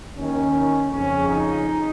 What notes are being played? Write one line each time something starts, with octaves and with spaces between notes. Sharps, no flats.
D#2 D#3 C#4
F2 C#3 C#4
D#4